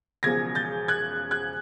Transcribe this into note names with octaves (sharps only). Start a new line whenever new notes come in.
E1 E2 C#3 F3 G#6 A#6
G6 A6
F#6 G#6
F#6 G#6